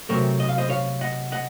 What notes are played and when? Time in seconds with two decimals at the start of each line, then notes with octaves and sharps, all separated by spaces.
0.09 C3 F#3 A3 C4 A#4 C#5
0.40 D#5
0.49 F5
0.58 C5 D#5
0.70 C#5 F5
1.01 D#5 F#5
1.32 D#5 F#5